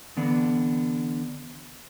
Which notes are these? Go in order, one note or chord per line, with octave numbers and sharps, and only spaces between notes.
D3 E3 B3 D4